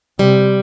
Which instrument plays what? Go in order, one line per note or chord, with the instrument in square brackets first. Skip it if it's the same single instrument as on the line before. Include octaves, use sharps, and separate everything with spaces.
[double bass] C3 [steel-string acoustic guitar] G3